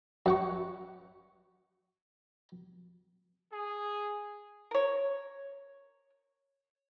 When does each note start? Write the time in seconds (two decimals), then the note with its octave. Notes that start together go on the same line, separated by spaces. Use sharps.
0.26 F#2 F#5 C#6
3.53 G#4
4.71 A#4 C#5